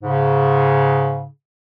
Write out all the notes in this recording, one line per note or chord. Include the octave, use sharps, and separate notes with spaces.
G#2 C#3